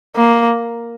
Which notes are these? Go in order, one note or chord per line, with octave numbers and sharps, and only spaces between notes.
A#3